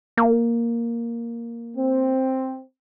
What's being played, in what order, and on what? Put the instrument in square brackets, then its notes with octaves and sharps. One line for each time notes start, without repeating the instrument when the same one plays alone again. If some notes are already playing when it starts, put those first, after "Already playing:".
[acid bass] A#3
[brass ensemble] C4